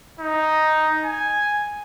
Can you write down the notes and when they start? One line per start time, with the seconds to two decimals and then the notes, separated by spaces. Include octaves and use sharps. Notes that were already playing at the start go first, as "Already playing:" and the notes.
0.20 D#4
1.04 G#5